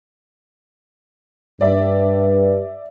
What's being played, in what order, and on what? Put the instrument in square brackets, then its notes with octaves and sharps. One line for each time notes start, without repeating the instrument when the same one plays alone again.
[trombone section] G2 [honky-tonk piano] D5 E5